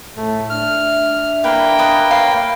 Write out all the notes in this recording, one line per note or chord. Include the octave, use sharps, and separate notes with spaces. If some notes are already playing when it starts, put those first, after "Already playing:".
A2 A3
D4 E5 F6
A#3 E4 B4 G5
B4 D#5 A5
B4 C#5 F5